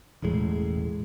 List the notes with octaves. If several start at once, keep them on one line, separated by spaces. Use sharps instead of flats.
E1 A1 A2 G#3